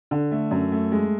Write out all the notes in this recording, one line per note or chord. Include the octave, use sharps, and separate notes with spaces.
D3
A3
F#2
A3
G#3